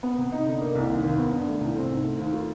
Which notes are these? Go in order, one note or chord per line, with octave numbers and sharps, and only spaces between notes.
B3
C3
D#4
D3
A#3
C2
D#2
D#2
B3
G2
A3
C2
C4
G#2
A3
D#2
F4